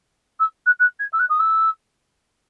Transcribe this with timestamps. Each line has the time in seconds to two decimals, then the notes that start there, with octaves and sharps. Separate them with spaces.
0.39 E6
0.66 F#6
0.79 F#6
0.99 G#6
1.13 E6
1.19 F#6
1.29 D#6
1.39 E6